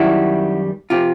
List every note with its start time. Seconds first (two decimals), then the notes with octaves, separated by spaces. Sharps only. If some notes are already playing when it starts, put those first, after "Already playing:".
Already playing: F#2 D#3 G3 E4 F#4
0.90 C3 F3 F4 G4